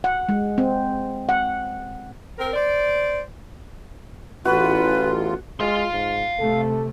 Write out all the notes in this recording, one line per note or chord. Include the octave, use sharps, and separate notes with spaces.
F#5
G#3
C4
F#5
C4 A#4
C5 D5
A1 E2 F4 F#4 B4
G#3 F5 C6
G#2
C3 A3 A4